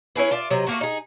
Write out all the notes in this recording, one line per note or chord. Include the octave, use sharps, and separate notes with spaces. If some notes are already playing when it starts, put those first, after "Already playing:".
C#4 E4 G#4 B4
F4 D5 E5
C3 F#3 D#5
A3 A#3 F#4
D#4 G#4